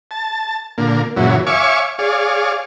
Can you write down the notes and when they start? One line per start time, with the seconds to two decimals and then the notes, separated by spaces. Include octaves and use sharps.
0.11 A5
0.78 A#2 D3 A#3
1.16 F#2 A#2 C#3 E3 F#3
1.47 C#5 E5 F5 G#5 C#6 D6
1.99 G#4 C#5 D5 F5